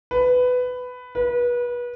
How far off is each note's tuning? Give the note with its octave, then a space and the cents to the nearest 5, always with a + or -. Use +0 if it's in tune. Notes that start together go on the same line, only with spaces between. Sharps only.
B4 +15
B4 -30